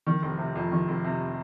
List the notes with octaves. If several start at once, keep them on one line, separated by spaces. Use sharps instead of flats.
D#3
F1
C3
F2
D#3
F1
C3